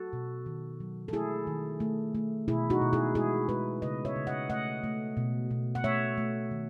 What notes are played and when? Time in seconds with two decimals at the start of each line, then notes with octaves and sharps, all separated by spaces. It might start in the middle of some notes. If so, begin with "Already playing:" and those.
Already playing: F#4 A4
0.13 B2
0.46 D#3
0.80 F#3
1.08 A4
1.13 A3 E4 G#4
1.47 D#3
1.80 A3
2.15 A3
2.48 B2 E4 G#4
2.70 D#4 F#4
2.81 B2
2.93 E4 G#4
3.15 G#3 E4 G#4
3.49 G#3 G#4 B4
3.82 C#3 B4 D#5
4.05 C#5 E5
4.16 C#3
4.27 D#5 F#5
4.49 A3 D#5 F#5
4.84 A3
5.17 B2
5.51 B2
5.75 F#5
5.84 A3 C#5 E5
6.18 A3
6.51 D#3